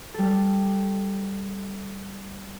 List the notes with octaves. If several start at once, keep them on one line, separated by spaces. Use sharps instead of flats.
G3 A4